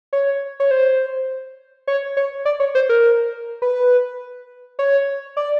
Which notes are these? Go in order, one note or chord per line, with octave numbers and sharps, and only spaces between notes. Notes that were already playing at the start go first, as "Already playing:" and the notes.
C#5
C#5
C5
C#5
C#5
D5
C#5
C5
A#4
B4
C#5
D5